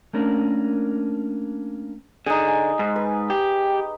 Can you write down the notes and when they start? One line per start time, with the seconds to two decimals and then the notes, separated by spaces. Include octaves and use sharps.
0.14 A3 A#3 C#4 D4 A#4
2.26 D3 D#4 G#4
2.48 G#5
2.79 G#2
2.96 B4
3.30 G4